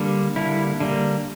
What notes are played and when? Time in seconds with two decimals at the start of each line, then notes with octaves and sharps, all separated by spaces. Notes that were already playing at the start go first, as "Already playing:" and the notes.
Already playing: D3 G3 A#3
0.36 D3 G3 A#3 E4
0.80 D3 G3 A#3